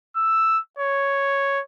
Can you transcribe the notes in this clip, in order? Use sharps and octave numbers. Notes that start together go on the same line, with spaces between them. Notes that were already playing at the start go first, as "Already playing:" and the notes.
E6
C#5